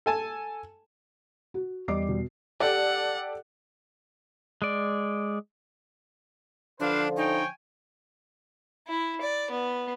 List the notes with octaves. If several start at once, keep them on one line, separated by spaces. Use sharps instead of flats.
A4 G#5 A5
F#4
E2 G3 D#5 D6 C7
B2
G4 A4 D5 F#5
G#3 D5
D3 F3 D4 B4 C5 F5
D#4 C#5 G5 G#5
E4
D5
B3